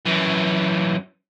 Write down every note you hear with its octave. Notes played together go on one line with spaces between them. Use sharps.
F#2 E3